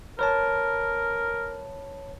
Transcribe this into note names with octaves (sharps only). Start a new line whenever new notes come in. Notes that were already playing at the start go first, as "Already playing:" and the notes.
A#4 B4 C#5 A5